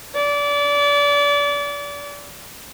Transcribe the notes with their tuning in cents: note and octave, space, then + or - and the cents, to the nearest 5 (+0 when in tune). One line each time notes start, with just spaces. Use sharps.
D5 -30